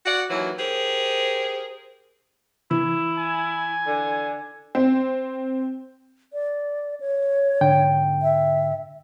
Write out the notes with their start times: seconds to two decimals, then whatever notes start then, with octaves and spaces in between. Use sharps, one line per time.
0.06 F#4 D5 F#5
0.29 D#2 E3 F#3
0.59 G4 G#4 A#4 C5
2.71 E3 E4
3.18 G#5
3.86 D3
4.75 C4
6.33 D5
7.00 C#5
7.61 G#2 D3 G5
8.22 E5